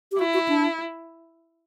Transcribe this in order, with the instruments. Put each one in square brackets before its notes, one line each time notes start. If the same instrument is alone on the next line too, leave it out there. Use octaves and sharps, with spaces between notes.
[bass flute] G4
[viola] E4 [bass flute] F#4
[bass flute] F#4
D4